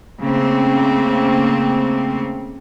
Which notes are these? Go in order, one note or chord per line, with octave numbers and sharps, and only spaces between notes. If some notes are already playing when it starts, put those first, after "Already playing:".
C#3 A3 A#3 C4